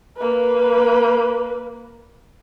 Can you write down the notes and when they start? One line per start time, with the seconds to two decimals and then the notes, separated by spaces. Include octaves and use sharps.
0.17 A#3 B4